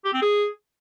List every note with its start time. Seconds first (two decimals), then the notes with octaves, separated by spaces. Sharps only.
0.05 G4
0.13 C4
0.22 G#4